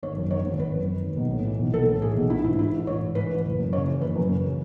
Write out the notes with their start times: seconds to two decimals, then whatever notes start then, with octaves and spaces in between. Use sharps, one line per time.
0.03 G#1 C#5
0.17 F#2
0.31 D#3 C#5
0.45 G#1
0.59 G#1 B4
0.74 F#2
0.88 D#3
1.02 G#1
1.17 B1
1.31 A2
1.45 E3
1.59 B1
1.74 B1 A4
1.87 A2
2.01 E3 G#4
2.16 B1
2.30 A1 E4
2.44 G#2 E4
2.59 E3 E4
2.73 A1
2.87 A1 C#5
3.01 G#2
3.15 E3 B4
3.30 A1
3.45 F#1
3.59 F#2
3.72 C#3 C#5
3.86 E3
4.01 F#1 B4
4.16 F#2
4.29 C#3
4.44 E3